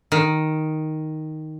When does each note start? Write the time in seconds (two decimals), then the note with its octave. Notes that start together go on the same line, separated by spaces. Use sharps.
0.12 D#3